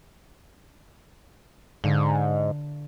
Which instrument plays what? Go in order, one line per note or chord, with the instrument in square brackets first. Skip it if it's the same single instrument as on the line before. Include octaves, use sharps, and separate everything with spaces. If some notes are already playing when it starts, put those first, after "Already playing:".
[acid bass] G#2 [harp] D3 F5 C#7